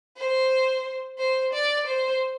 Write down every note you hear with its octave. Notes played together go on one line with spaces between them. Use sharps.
C5
C5
D5
C5